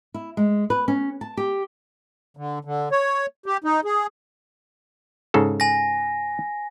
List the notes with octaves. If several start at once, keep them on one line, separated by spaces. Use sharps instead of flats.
E4
G#3
B4
C#4
A5
G4
D3
D3
C#5
G4
D#4
G#4
G#2 C#3 A4
G#5 A#6